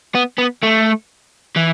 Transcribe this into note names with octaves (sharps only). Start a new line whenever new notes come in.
B3
B3
A3
E3